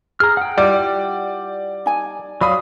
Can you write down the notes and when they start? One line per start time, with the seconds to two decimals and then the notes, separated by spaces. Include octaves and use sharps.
0.20 G#4 A#5 F6
0.37 F#5 G5
0.58 G3 E4 F4 G4 D5
1.86 D#4 G#5
2.41 F#3 D5 F5 B5 D#6